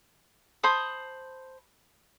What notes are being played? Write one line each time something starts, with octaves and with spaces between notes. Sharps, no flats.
C5 A5 B5 D#6